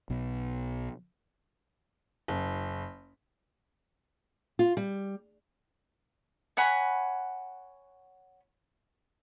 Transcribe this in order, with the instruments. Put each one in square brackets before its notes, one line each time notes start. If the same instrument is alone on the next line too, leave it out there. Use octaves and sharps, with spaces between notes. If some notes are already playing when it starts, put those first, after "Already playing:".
[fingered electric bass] B1 B2
[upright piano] F#1
[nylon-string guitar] F4
G3
[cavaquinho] C#5 F#5 G#5 B5